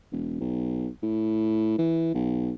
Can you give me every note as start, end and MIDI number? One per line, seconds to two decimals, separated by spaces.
0.12 0.37 28
0.40 0.88 35
1.02 1.75 45
1.78 2.12 52
2.14 2.53 35